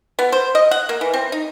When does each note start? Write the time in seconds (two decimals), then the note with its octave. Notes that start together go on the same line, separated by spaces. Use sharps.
0.19 B3
0.32 C5
0.55 D#5
0.71 F#5
0.89 A#3
1.01 E3
1.14 C4
1.32 D#4